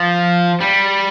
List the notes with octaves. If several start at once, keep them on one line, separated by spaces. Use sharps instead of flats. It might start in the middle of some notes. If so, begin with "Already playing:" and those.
Already playing: F3
G3